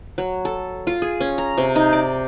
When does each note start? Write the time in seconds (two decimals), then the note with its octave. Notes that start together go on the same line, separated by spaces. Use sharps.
0.18 F#3
0.45 A4
0.87 F4
1.02 G#4
1.20 C#4
1.38 A#5
1.58 C3
1.76 D#4
1.93 D5